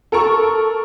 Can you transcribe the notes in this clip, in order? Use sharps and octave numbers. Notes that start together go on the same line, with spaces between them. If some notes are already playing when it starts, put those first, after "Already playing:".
A4 A#4 C#6